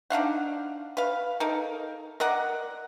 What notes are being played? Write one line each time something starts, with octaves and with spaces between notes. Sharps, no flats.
D4 D#4 F5 F#5
B4 F5
D#4 A4 A#4
A#4 D5 D#5 F#5